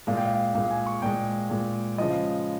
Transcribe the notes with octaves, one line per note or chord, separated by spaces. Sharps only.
A#2 G#3 F5
G5
F5
A#2 G#3 F5
G#5
C#6
A#2 G#3 G5
A#2 G#3
C#3 F3 G#3 D#5